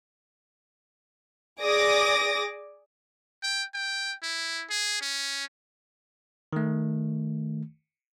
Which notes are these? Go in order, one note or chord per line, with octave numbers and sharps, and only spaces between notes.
G#4 D5 D6 D#6 A#6
G5
G5
E4
G#4
C#4
D#3 A3